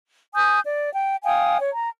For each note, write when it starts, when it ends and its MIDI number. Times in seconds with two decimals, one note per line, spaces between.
0.35 0.60 80
0.35 0.60 87
0.35 0.60 91
0.65 0.91 74
0.94 1.17 79
1.24 1.57 77
1.24 1.57 79
1.24 1.57 80
1.24 1.57 87
1.59 1.71 73
1.73 1.90 82